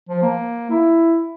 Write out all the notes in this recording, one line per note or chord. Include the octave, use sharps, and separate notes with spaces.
F3
A#3
E4